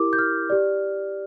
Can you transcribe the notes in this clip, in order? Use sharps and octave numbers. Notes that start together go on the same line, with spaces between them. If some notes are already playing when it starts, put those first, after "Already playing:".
Already playing: E4 G4 A#4 D6
G6
F6
G4 D5